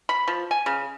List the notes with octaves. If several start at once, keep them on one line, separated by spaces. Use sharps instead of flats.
B5
F3
G#5
C#3